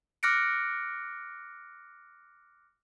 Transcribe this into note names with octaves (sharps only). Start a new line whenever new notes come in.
D6 F6 F#6 A#6 C#7 D7